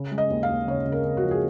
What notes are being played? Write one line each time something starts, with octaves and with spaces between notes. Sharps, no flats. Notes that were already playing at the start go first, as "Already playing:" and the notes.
Already playing: C#3
G#3
D#5
D#2
F5
D#2
C#3 C#5
C#3
A#4
C#3
F#4
F3
G#4